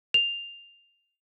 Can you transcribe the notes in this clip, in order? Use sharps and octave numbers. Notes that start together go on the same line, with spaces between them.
F7